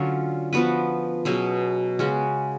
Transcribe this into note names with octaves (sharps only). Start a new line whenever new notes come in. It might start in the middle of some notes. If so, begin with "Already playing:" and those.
Already playing: D3 F#3 C#4 F4
F3 B3 F#4 B4
B2 F#3 C#4 G#4
C#3 G#3 C#4 F#4